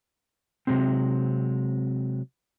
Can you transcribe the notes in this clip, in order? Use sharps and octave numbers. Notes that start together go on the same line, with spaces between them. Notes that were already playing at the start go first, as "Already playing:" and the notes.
C3 D#3 F#3 G#3 C4